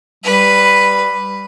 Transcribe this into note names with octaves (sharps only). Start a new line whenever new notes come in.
G3 B4